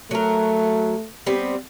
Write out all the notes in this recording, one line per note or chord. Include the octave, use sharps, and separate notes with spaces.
F#3 A3 A#4
G3 B3 C4